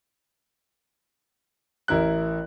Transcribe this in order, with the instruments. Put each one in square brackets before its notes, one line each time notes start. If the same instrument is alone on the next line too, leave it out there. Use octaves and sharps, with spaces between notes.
[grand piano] A1 E4 A#4 F#6